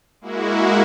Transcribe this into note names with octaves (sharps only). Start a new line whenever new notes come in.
G#3 A#3 E4 F#4